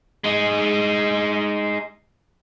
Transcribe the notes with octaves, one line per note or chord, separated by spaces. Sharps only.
G#3 D#4